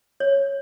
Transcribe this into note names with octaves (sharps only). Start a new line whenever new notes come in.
C#5